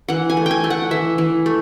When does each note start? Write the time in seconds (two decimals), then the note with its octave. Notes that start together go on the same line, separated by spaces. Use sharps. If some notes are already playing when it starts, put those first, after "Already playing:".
0.08 E3 F#5
0.30 G#5
0.37 A3
0.46 G5 G#5
0.64 A3
0.70 F#5
0.91 E3 E5
1.18 E3
1.46 A3